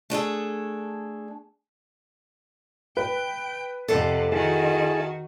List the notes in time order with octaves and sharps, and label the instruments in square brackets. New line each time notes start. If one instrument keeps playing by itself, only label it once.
[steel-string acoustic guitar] A3 D4 G#4 A4
[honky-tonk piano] B4 [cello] G5
[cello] F2 C3 [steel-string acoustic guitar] A4 D5 F#5
[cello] D#3 F#4 [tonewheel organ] E4 G#4 A5